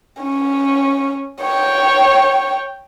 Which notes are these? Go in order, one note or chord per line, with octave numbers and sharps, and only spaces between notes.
C#4
C#5 G5